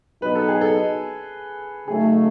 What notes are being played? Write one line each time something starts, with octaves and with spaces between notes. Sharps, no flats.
B2 F#3 B3 D#4 B4
A4
G#4
A4
C#3 F#3 A3 D#4 G#4